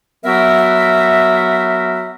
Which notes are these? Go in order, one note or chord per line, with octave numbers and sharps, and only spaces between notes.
F#3 B3 F#4 A#4 E5